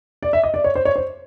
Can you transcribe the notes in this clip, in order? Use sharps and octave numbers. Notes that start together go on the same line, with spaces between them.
D5
E5
D#5
D5
C#5
C5
C#5
C5